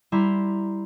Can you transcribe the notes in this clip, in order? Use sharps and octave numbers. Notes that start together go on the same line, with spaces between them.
G3 E4 A#5 C6